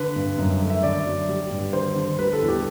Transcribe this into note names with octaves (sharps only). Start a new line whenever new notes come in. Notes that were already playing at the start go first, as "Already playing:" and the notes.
Already playing: D3 B4
G2
F#2
A3
E5
D3 D5
F#3
G3
G2
D3 C5
D3
G3 B4
A4
E2
G4